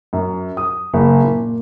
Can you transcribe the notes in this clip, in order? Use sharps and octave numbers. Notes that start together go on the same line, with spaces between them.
F#2
D#6
F#1
A#2